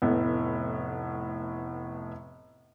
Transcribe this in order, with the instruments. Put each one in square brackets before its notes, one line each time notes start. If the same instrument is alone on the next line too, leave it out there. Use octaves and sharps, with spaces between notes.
[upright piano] F1 A2 B3